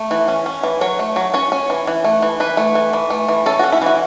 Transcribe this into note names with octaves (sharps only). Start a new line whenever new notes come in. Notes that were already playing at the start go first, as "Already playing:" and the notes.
Already playing: A3
E3
C#4
C#4
E3
F#3 C#5
A3
F#3
C#4 C#5
C#4
E3
E3
A3
E3
E3 B4
A3
E3
E3
A3
E3
C#4 A4
F#4
C#4
E4
E3 F#4